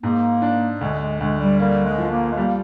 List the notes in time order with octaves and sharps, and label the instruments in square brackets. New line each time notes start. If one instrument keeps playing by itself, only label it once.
[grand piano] G#2 [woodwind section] A#3
[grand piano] D4
[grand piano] D2 [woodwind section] G#3
[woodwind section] G#3
[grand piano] D2 [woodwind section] G#3
[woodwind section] G3
[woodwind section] G3 [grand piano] A#3
[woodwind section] G#3
[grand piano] F3
[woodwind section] A#3
G#3
[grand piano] G3 [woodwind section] A#3